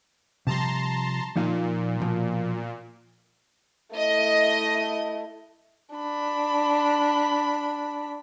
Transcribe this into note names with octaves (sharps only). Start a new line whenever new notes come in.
C3 F3 G3 A5 A#5 C6
A#2 F3 D#4 F5
B2 F3 F4
A3 E4 D#5
D4 B5